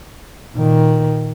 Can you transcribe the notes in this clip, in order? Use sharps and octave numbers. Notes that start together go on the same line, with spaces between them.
A#2 D#3